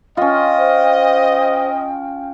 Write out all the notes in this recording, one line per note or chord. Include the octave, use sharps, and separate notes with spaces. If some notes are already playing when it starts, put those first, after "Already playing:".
C#4 F4 D#5 G5
C5